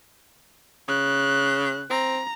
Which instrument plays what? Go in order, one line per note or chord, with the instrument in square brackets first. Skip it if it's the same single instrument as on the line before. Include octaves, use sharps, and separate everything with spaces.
[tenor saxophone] C#3 [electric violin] F#6
[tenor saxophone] C4 [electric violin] A#5